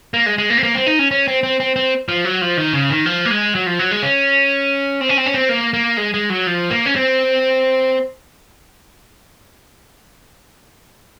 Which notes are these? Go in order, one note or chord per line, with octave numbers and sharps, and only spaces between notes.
A#3
G#3
G#3
A#3
C4
A#3
C4
D#4
C#4
C#4
C4
C4
C4
C4
F3
F#3
F3
D#3
C#3
D#3
F3
A#3
G#3
F#3
F3
F#3
G#3
C#4
C4
C#4
C4
C#4
C4
A#3
A#3
G#3
G#3
F#3
F3
A#3
C#4
C4